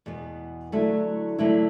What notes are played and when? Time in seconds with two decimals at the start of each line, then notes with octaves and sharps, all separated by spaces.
0.06 E2 B2 B3
0.72 D3 F#3 A3 E4
1.38 D3 F#3 A3 E4 B4